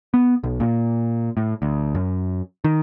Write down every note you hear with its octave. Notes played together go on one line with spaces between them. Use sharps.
B3
B1
A#2
A2
D2
F#2
D#3